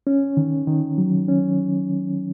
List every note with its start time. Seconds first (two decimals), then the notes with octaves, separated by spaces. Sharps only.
0.07 C#4
0.37 D#3
0.67 D#3
0.98 F#3
1.28 C#4